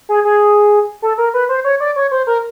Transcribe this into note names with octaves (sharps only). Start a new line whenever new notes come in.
G#4
G#4
A4
A#4
B4
C5
C#5
D5
C#5
C5
A#4